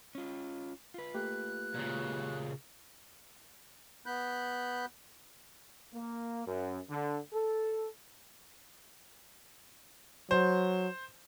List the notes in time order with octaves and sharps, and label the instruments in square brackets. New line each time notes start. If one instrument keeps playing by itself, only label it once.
[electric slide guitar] C#4 F4
F4 B4
[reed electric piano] A3 A#3 G4 [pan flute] F#6
[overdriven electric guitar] A#2 C#3
[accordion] B3 B5 F#6 G6
[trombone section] A#3
F#2
D3
A4
[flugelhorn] F#3 [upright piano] C5